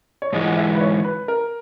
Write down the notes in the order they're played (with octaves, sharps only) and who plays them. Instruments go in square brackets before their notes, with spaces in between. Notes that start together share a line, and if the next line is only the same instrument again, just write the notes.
[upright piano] C#5
[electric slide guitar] G#2 E3 G#3 [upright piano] D#5
[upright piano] F#5
E5
B4
C#5
B4
A#4